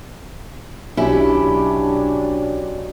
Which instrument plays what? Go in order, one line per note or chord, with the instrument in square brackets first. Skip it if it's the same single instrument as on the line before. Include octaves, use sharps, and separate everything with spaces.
[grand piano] B1 [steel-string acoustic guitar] C#4 G4 [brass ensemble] D4 [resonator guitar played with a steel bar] E4